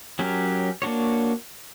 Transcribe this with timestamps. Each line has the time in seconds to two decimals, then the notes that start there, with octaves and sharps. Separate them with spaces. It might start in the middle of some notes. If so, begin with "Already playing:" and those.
0.19 F#3 C#4 G4 A#4
0.82 A#3 D4 F#4 C#5